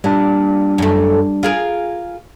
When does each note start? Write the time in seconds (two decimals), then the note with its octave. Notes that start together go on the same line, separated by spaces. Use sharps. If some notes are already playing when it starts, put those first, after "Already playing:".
0.04 A#2 G3 D4
0.78 F#2 A3
1.43 F4 G#4 A#4